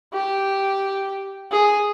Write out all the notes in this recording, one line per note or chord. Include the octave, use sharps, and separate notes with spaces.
G4
G#4